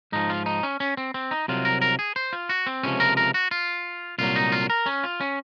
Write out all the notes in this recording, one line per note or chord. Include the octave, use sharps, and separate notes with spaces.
G#2 F3 D#4
F4
D#4
C#4
C#4
C4
C4
D#4
C2 C3 F#3 F4
A#4
A#4
G#4
C5
F4
F#4
C4
C#2 C3 F3 C#4
A#4
A#4
F#4
F4
C2 A#2 F#3 F4
D#4
F4
A#4
C#4
F4
C#4